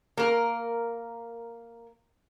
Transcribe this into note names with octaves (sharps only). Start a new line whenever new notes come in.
A#3 A#4